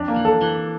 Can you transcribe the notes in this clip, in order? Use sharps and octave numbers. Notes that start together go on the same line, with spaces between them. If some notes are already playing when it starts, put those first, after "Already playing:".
Already playing: F2 D4
A#3
E3
A4
E3